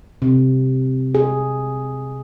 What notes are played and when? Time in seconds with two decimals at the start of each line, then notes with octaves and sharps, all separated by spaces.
0.22 C3
1.15 G#4